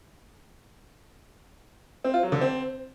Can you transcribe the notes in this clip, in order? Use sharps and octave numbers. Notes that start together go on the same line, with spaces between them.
C4
F4
F#3
D3
C4